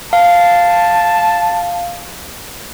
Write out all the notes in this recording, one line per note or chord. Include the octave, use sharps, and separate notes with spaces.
F5 A5